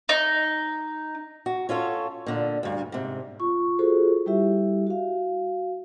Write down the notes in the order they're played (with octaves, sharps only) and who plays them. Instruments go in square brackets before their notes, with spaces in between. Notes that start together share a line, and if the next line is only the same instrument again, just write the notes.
[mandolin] D#4
[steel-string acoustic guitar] F#4
C#4 F4 A4 C#5
A#2 D3
D2 G2
G#2 C3
[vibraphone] F4 C#6
F4 F#4 G#4 A4 C5
G3 E4 G4 E5
F#4 F5